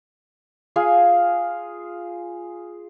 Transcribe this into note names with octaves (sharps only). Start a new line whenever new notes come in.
F4 G#4 F5 G#5